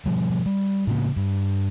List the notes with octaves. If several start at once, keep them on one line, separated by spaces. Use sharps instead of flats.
B2 F3 G3
G3
A2 C#3 A#3
G2